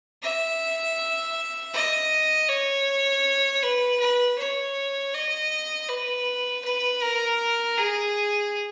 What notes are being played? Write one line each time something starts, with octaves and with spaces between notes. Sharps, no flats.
E5
D#5
C#5
B4
B4
C#5
D#5
B4
B4
A#4
G#4